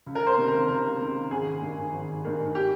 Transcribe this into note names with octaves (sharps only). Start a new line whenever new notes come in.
C#2
A#4
C5
C3 D#3
A#4
C#2 A#4
C3 D#3
G#1 G#4
G2 D#3
G#1
G2 D#3
G4